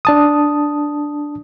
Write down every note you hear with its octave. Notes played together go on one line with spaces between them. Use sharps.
D4 A5 D#6